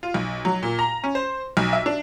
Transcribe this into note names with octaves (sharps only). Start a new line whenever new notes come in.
F4
B1
F#3
A#2
A#5
C#4
C5
B1
E5
D4